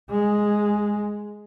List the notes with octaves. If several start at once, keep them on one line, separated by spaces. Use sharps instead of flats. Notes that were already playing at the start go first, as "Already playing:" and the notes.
G#3